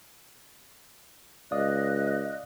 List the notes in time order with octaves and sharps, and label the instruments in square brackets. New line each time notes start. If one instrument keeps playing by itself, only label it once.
[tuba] C#2 [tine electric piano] D5 F5 D#6 [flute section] D#5 F#6